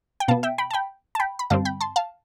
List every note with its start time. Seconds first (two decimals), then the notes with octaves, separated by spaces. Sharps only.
0.20 G5
0.28 B2 B3 F5 A5
0.43 E5 G5
0.58 G5 B5
0.71 A5
0.74 G5 B5
1.15 A5
1.20 G5 B5
1.39 B5
1.50 G2 D3 G3 C4 F5 A5
1.65 G5 B5
1.81 A5 C6
1.96 F5 A5